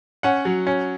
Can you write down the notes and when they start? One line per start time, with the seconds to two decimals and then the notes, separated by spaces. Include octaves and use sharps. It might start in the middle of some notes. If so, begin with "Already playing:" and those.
0.23 C#4 F#5
0.45 F#3
0.67 C#4